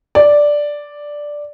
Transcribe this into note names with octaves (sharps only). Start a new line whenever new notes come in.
D5